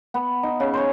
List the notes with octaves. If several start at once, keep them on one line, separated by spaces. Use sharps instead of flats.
B3
D#4
C#3
C5 C#5